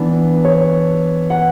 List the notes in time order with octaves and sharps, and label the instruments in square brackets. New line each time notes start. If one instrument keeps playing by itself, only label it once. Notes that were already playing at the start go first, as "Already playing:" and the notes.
Already playing: [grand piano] E3 B3 D4
C#5
F#5